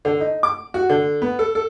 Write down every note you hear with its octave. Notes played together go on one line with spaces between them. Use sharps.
D3
D#4
D6
F#4
D3
B3
A4
A4